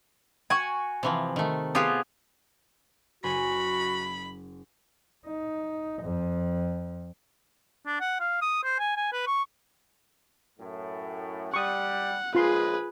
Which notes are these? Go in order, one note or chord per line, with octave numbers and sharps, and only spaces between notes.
F#4 G#5 C#6
C3 E3 F3
D#3 A3
B3 F4 G4 G#4
F#1 F#4 C5 G#5 B5
D#4
F2
D4
F#5
F5
D#6
C5
G#5
G#5
B4
C#6
F#2 A2
G3 F#5 C#6 D#6
A#1 G#3 F4 G#4 B4 C6